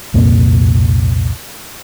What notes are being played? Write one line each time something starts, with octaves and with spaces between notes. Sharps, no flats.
C2 F2 A#2 A#3